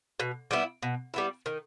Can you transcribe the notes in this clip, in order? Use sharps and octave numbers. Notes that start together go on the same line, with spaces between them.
B2
G3 B3 E4
B2
G3 B3 E4
D#3